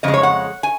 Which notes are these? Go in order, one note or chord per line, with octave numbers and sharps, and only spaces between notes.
F2 C#3 G#3 D#5
C#5
F#5
G#5